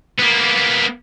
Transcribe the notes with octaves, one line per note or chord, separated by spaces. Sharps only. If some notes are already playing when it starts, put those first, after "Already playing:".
A#3 B3